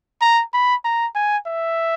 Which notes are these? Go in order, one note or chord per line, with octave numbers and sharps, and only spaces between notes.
A#5
B5
A#5
G#5
E5